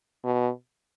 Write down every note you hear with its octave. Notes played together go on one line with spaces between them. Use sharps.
B2